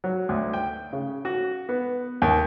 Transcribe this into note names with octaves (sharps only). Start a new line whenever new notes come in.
F#3
D2
G5
C#3
F#4
B3
D#2